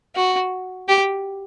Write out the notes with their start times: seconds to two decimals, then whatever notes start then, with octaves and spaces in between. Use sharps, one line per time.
0.15 F#4
0.89 G4